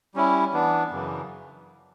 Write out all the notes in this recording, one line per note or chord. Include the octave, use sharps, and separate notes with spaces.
G3 C#4 E4
E3 B3 D4
F#2 C#3 E3